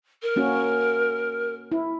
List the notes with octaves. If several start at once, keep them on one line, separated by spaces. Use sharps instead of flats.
A#4
A#3 C#4 F#4
E4